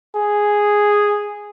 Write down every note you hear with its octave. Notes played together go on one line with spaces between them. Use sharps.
G#4